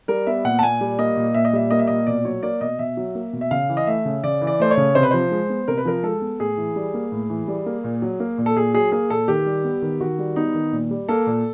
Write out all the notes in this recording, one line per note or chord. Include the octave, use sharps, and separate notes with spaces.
G3 A#4
B3 E5
A#2 F#5
A5
A#2 G#5
G3
A#3 D#5
A#2
A#2 E5
D#5
G3 E5
A#3 D#5
E5
A#2 D#5
B2 D5
F#3 C#5
A#3 D5
B2 D#5
B2 E5
F#3
A#3
B2
E5
C#3 F5
E3
D#5
A3 E5
C#3
C#3 D5
E3
D5
A3 C5
C#5
C#3
C3 C5
B4
F3 C5
G#3
B3
C3 A#4
B4
F3 A#4
G#3 A4
B3
A2 G#4
E3
G3
A#3
A2
E3
G3
A#3
A#2
F#3
A#3
A#2
A4
A#2 G#4
F#3 G#4
A#3 G#4
A#2 A4
D#3 G4
G3
B3
D#3
D#3 F#4
G3
B3 D#4
D#3
A#2
G3
A#3 A4
A#2